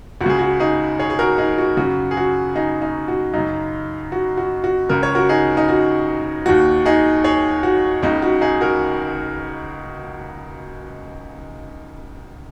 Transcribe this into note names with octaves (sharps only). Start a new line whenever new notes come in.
C#2 F#4
C#3 G#4
F#4
D#4 G#4
G#4 C#5
G#4
F#4 A#4
D#4 G#4
F#4
F#2 C#3 F#4
G#4
F#4
D#4 G#4
D#4
F#4
F#2 C#3 D#4
F#4
F#4
F#4
C#2 C#3 A#4
C#5
F#4 A#4
D#4 G#4
D#4
F#4
D#2 D#3 F#4
D#4 G#4
G#4 C#5
F#4
C#2 C#3 D#4
F#4
D#4 G#4
F#4 A#4